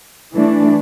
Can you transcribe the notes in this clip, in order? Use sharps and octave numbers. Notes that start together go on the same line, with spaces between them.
E3 A3 D4